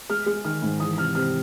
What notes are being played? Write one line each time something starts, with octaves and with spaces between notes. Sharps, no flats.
G#3 F6
G#3
D#3 F6
G#2
E3 D#6
C3 F6
C3 F6